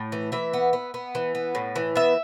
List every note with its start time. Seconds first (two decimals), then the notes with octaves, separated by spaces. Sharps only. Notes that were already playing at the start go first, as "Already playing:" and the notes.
Already playing: A2
0.12 E3
0.32 E3 E5
0.53 B3
0.73 B3
0.94 B3
1.15 E3
1.35 B3
1.55 A2
1.76 E3
1.96 B3 E5